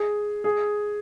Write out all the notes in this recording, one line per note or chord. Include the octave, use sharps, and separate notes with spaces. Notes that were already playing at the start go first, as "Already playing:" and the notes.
Already playing: G#4
G#4